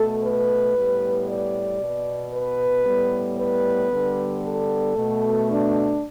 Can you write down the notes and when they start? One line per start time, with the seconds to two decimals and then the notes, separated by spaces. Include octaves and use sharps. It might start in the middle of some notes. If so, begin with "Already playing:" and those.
Already playing: B2 A3 A4
0.23 B4
0.75 A2 G3 B3
1.28 D5
1.81 B2 B3
2.33 B4
2.85 A2 G3 B3
3.38 B4
3.91 D3 G3 B3
4.43 A4
4.96 B2 A3
5.49 D4